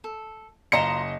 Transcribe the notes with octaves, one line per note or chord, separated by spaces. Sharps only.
A4
F#1 F4 D#5 A#5 C6 C#7 E7